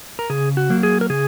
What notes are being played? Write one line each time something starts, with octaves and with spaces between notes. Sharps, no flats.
A#4
C#3 G#4
F#4
F#3 A#3
G#4
A#4
C#3 G#4